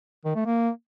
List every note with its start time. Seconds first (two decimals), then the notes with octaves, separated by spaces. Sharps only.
0.25 D#3
0.35 A3
0.46 A#3